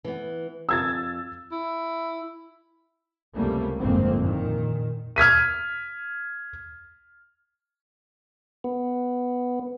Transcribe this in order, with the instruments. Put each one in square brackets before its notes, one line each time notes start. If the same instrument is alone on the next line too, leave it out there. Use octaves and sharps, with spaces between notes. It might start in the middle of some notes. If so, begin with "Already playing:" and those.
[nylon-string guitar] E3 B3
[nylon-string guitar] F2 [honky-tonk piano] E6 G#6 A6
[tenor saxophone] E4
[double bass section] C#2 C3 G3 A3 A#3
G1 F2 G#2 A#3 C4
A#2 D#3
[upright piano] F6 G#6 B6 D#7
[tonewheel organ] B3